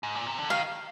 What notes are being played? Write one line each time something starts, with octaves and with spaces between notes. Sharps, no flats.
G#2
A#2
C3
D3
D#3 F5